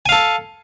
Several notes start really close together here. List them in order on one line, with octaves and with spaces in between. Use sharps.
G#5 F5 A4